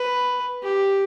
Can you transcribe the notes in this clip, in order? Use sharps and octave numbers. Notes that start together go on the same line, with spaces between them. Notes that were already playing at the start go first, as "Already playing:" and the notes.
Already playing: B4
G4